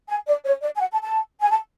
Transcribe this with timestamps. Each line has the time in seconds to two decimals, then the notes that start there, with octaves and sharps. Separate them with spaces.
0.09 G#5
0.27 D5
0.45 C#5
0.62 D5
0.76 G#5
0.80 F#5
0.92 A5
1.03 A5
1.41 G#5
1.50 A5